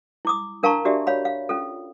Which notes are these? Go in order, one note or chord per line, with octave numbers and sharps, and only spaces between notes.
E4 D6 D#6
D4 A#4 F5 A5 A#5 C#6
D4 F#4 G4 D5 E5
C#5 F5 B5
F5
C#4 F4 A4